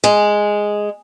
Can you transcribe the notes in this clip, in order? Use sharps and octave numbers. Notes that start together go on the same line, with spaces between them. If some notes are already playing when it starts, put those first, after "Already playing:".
G#3